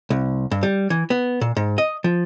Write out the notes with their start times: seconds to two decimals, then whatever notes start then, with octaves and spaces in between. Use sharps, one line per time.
0.10 C2
0.51 G2
0.63 G3
0.90 E3
1.10 B3
1.41 A#2
1.57 G#2
1.78 D#5
2.04 F3